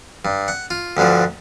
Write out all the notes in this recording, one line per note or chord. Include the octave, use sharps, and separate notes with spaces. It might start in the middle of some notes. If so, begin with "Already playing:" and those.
G2
F#5
F4
D2 G2 D3 F3